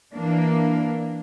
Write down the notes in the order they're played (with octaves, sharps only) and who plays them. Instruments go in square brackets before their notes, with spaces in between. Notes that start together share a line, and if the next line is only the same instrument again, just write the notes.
[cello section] E3 A#3 D4